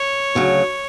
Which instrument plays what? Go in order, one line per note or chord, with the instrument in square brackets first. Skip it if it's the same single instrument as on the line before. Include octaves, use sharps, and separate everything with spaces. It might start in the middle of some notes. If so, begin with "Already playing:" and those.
Already playing: [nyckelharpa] C#5
[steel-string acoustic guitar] D2 C#3 F#3